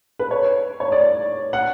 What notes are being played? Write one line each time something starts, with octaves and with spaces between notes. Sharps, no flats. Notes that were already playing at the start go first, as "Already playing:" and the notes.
B4
C#5
C#5
D5
F#5